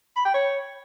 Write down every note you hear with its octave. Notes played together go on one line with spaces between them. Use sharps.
B5
G5
C#5